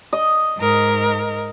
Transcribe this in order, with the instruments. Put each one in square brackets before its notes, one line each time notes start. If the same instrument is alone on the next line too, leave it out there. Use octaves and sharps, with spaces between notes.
[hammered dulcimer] D#5
[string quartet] G#2 A#4